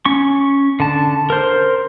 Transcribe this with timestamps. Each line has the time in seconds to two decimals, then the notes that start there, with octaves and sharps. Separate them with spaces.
0.05 C#4 C#6
0.80 D3 A5
1.30 A#4 C5